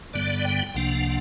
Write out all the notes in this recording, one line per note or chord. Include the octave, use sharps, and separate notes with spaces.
G2 D3 G3 B3 D5
G5
C2 C3 F3 A#3 D4 F#5